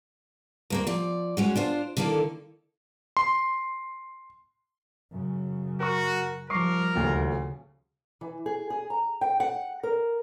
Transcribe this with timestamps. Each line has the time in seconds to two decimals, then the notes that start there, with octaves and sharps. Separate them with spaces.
0.70 D2 A#3 C4
0.87 F3 D5
1.37 G#3 C#4 F#4
1.56 D4 F4 C5
1.97 D3 D#3 A#3 E4 A4
3.17 C6
5.12 F#2 C#3
5.80 F#4 A#4 C#6
6.50 F3 G3 A#4 C#6 D6 C7
6.96 D#1 D2 C#3
8.21 E3
8.46 G#4
8.70 G#4
8.90 A#5
9.21 G5
9.40 F#5
9.83 A#4